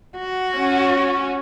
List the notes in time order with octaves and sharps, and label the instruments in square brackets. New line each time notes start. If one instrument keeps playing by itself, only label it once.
[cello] F#4
[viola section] C#4